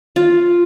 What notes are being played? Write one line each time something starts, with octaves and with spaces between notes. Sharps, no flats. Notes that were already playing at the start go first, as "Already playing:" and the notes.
F4